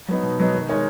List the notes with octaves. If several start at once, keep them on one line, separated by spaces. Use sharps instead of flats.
F#3 B3 D#4
B2
F#3 B3 D#4
D#3
G#3 D#4 A#4 C#5